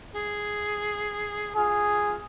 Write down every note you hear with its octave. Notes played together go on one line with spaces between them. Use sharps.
G#4
F4 G#4